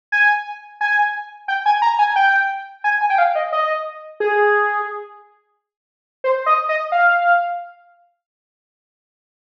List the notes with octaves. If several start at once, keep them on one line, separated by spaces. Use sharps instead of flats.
G#5
G#5
G5
G#5
A#5
G#5
G5
G#5
G#5
G5
F5
D#5
D#5
G#4
C5
D#5
D#5
F5